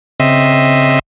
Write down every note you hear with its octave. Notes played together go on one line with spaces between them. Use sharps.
C#3 C4 D#5 E5